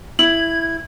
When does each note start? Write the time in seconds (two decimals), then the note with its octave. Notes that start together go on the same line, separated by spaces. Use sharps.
0.19 E4 G#6 F#7